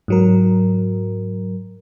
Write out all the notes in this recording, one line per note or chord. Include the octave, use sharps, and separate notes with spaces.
G#2 F#3 A#4